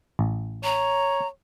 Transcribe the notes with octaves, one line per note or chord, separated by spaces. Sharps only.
A1
C#5 A#5